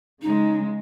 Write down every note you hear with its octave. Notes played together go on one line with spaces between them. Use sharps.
C#3 G#3 D#4